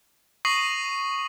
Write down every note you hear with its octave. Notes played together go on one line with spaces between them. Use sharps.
C#6 D#6 A#6 C7 D#7 F#7